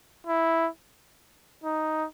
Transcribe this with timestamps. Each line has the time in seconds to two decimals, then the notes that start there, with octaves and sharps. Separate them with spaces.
0.27 E4
1.64 D#4